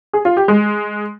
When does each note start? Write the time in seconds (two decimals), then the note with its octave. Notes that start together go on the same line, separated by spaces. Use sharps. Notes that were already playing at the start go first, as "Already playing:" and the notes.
0.13 G#4
0.25 F4
0.37 G4
0.48 G#3